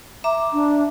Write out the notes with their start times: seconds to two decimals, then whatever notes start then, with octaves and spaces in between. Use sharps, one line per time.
0.24 E5 A#5 D6
0.53 D4